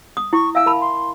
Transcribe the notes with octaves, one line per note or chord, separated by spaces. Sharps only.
D#6
E4 C#6
E5 F5 G#5 E6
A#4 A5 B5
C6